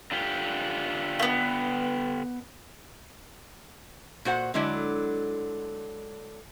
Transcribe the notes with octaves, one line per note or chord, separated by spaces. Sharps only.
D3 F4 G4
A3 B3
A#2 F#4 C5 F#5
D3 F#3 G#3 D4 E4